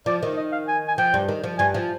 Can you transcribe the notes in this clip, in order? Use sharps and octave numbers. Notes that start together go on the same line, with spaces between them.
F3 D5
D#3
D#5
F5
G#5
G#5
F3 G5
G2 G3
D#3
F3
G2 G3 G#5
F3